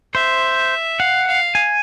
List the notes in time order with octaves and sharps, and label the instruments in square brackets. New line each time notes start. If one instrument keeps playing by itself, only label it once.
[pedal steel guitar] C5 [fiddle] E5
[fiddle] F5 [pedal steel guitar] F#5
[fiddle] F5
[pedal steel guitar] G#5